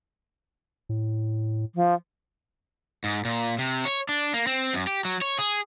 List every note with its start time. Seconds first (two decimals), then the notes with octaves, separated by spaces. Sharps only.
0.89 A2
1.75 F3
3.04 G#2
3.25 A#2
3.59 C3
3.85 C#5
4.09 D4
4.34 A#3
4.47 C4
4.73 F#2
4.87 G4
5.05 F#3
5.22 C#5
5.39 G#4